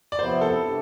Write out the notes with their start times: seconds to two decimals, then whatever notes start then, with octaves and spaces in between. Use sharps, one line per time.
0.12 D5
0.18 C3 F3 B3 E4 C5
0.41 A4
0.64 C3 G3 D4